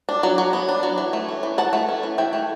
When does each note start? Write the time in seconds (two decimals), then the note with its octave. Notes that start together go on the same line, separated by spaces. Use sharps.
0.09 D4
0.23 F#3
0.38 F#3
0.53 B3
0.69 D4
0.83 F#3
0.98 E3
1.13 A3
1.28 C#4
1.43 E3
1.58 E3 F#5 A5
1.73 A3
1.89 C#4
2.03 E3
2.18 E3 E5 G5
2.33 A3